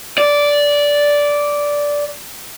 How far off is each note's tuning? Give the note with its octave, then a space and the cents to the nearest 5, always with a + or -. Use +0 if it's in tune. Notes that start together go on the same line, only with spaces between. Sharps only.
D5 -10